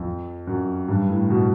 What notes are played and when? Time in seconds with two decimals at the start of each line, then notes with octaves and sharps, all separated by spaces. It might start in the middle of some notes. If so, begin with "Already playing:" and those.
Already playing: F2
0.47 F#2
0.88 G2
1.09 A2
1.30 B2